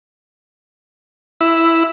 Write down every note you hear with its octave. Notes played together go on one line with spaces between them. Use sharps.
E4